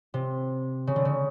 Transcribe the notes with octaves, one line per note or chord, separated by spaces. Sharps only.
C3
C#3
D3
C#3